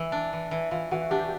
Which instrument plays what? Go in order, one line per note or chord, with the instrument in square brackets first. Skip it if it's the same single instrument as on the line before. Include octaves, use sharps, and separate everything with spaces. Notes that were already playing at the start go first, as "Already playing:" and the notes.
Already playing: [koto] E3 [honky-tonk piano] E4
[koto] D4
E3
E3
[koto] E3 [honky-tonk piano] F4
[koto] E3 [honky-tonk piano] F#4
[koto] D4 [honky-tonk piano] G4